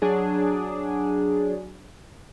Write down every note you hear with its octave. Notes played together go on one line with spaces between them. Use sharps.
F#3 D4 G#4